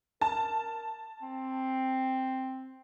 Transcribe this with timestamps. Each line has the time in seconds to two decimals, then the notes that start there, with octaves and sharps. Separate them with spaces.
0.21 A#4 A5
1.22 C4